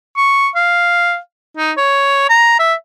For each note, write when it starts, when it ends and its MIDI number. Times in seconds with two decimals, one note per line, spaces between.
0.17 0.48 85
0.55 1.18 77
1.57 1.72 63
1.77 2.27 73
2.29 2.54 82
2.59 2.74 76